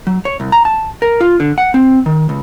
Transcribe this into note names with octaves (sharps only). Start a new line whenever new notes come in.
F#3
C#5
C2
A#5
A5
A#4
F4
D3
F#5
C4
D#3
C#2